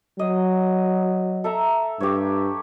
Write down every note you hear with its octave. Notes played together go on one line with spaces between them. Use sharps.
F#3 D#5
A4 E5 A#5
G2 G4 C#5